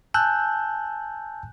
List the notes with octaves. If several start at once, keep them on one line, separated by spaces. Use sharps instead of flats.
G#5 A5 E6 F#6 G6